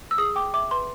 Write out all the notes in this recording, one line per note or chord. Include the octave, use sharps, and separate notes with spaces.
E6
G#4 D#6
G5 D6
E5 D6
B4 C6